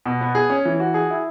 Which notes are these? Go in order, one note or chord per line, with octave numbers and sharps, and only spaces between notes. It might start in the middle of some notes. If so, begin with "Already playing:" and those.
B2
B3
G#4
C#4
E3
F#4
G#4
E4